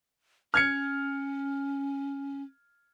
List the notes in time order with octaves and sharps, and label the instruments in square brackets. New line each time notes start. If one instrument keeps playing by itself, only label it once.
[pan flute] C#4 [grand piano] F6 G#6 C#7